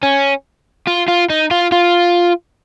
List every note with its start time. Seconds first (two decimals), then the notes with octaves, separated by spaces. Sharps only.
0.03 C#4
0.87 F4
1.08 F4
1.30 D#4
1.51 F4
1.72 F4